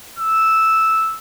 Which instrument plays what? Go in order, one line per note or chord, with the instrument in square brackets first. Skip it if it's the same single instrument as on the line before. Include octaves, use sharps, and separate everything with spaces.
[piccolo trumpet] E6